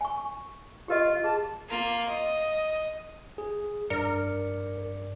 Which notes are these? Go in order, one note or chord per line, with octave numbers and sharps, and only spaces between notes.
G#5 C#6
F4 G4 A#4 D#5
G#4 A5
A#3 F4
D#5
G#4
G2 A#4 D5 C#7